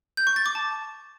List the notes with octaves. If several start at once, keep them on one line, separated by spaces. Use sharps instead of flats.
G6
C#6
A6
D6
A5